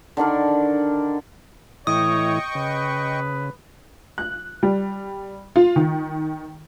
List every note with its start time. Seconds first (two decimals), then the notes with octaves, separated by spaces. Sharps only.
0.17 D3 D#3 D4 A#4
1.87 A2 E3 E4 C#5 D#5 G5 C#6 D#6
2.55 C#3 B4
4.18 F#6
4.63 G3
5.56 F4
5.76 D#3